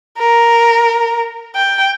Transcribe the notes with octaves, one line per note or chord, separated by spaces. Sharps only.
A#4
G5